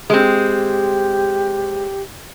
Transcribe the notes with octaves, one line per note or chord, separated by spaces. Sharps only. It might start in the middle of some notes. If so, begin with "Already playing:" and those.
G#3 C4 G4